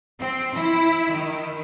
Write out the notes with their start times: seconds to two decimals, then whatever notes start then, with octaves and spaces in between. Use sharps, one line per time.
0.20 C4
0.54 E4
1.13 D#3